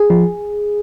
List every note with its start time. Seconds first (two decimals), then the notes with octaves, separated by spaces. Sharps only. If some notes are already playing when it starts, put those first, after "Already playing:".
Already playing: G#4
0.10 F3